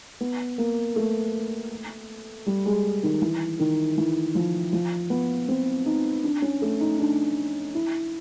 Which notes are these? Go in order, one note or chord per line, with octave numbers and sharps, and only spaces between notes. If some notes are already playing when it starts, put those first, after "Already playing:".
B3
A#3
A3
G3
G#3
D#3
E3
D#3
E3
F3
F3
B3
C4
D#4
D4
C#4
A3
D#4
D4
E4